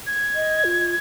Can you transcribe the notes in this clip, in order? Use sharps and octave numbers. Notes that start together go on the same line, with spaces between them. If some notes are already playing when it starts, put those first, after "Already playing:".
G#6
D#5
F4